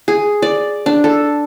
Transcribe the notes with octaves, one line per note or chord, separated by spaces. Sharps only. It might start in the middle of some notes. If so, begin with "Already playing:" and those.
G#4
D5
D4
A4